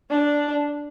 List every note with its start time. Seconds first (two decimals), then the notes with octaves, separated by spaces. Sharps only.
0.10 D4